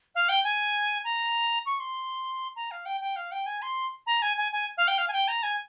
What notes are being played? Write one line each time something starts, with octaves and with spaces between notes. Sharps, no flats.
F5
G5
G#5
A#5
C#6
C6
A#5
F5
G5
G5
F5
G5
G#5
C6
A#5
G#5
G#5
G#5
F5
G5
F5
G#5
G5
A#5
G#5